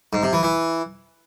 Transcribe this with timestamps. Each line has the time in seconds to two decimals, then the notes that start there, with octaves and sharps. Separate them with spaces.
0.13 G#2
0.23 C3
0.33 E3
0.43 E3